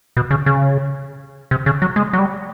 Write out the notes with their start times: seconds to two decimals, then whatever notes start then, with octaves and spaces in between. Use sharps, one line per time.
0.17 B2
0.31 C#3
0.46 C#3
1.51 C3
1.66 C#3
1.82 F#3
1.96 G#3
2.13 F#3
2.19 G3